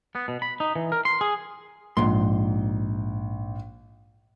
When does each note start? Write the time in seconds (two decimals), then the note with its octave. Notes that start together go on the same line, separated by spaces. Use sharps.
0.15 B3
0.28 B2
0.42 B5
0.60 D#4
0.76 E3
0.92 A#4
1.05 C6
1.21 G#4
1.97 A#1 G#2 C6